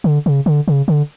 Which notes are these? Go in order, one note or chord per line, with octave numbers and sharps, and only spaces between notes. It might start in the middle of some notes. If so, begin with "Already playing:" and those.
D3
C#3
D3
C#3
D3